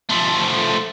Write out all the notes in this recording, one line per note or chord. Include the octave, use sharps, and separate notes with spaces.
F3 A3